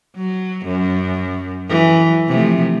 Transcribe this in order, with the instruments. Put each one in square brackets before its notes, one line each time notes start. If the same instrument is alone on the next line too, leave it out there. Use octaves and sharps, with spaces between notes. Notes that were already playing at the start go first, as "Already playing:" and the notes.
[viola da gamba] F#3
F#2
E3 F#3
C3 F3 A3